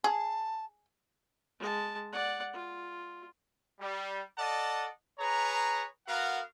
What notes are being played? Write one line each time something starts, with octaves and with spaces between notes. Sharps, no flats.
G#4 A5
G#3 A5
D5 F#5
F4
G3
A4 D5 D#5 F#5 A5
G#4 B4 C#5 A#5
B3 F#4 A#4 F5 F#5